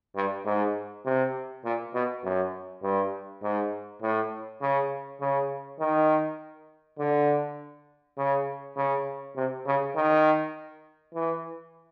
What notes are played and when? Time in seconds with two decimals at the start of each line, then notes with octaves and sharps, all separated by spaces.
0.16 G2
0.45 G#2
1.05 C3
1.65 A#2
1.94 B2
2.24 F#2
2.83 G2
3.43 G#2
4.02 A2
4.61 C#3
5.21 C#3
5.80 D#3
6.99 D3
8.18 C#3
8.76 C#3
9.36 C3
9.66 C#3
9.95 D#3
11.14 E3